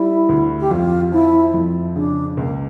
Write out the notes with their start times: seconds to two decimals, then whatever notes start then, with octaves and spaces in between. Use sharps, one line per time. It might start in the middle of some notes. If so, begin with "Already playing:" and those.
Already playing: G3 E4
0.29 D2
0.60 G4
0.71 F2 F4
1.12 F3 E4
1.54 F2
1.95 C#3 D4
2.37 C#2 A#3